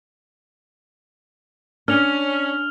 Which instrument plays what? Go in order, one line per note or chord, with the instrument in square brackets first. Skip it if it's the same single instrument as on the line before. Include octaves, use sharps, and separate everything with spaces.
[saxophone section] C#4 [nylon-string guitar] D4 [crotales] F6 F7 G7